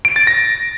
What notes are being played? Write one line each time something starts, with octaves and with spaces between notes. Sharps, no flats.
D7
A6
A#6